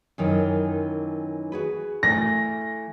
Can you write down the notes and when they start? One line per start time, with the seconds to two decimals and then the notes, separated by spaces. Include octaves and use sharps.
0.18 F#2 D#3 E3
1.52 F#4 G#4 B4
2.03 E3 A3 A#6